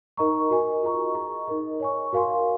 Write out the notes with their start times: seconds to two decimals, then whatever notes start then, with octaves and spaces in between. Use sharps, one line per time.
0.17 D#4 A#4 D#5 A#5 C#6
0.50 F#4 A#4 D#5 G#5
0.82 F4 G#4 D#5 A#5 C#6
1.15 G#4 D#5 A#5 C#6
1.47 D#4 A#4 D#5
1.80 C#5 G#5 C#6
2.13 F#4 A#4 F5 G#5 C6